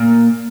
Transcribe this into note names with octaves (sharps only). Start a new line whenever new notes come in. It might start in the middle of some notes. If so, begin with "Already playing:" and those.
Already playing: A#2 A#3